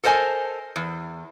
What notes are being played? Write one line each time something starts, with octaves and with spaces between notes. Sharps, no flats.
A4 A#4 C5 D#5 G#5 A5
E2